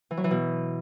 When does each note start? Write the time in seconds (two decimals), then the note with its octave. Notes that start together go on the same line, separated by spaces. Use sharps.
0.11 E3
0.17 F#3
0.24 E3
0.31 B2